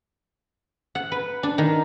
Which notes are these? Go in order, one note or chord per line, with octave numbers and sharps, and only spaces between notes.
F#5
B4
D4
D#3